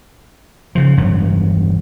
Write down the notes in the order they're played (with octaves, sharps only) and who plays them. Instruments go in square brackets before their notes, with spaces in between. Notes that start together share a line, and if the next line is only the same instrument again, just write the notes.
[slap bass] C#3 F3
E1 G2 F#3